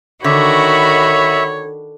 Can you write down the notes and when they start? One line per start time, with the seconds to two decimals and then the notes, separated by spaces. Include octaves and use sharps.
0.24 D3 D#3 F#4 C#5 E5 B5